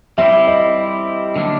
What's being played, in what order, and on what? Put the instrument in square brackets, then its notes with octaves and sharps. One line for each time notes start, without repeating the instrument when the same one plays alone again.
[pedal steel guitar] G3 C4 E4 G4 [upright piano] E5
[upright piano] D#5
[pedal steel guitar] D3 F#3 A#3 D4